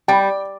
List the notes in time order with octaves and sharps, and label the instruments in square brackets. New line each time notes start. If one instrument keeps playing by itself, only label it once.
[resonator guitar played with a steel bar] G3 [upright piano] G5